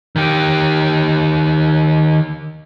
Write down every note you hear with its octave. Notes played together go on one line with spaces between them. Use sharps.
D#3 G4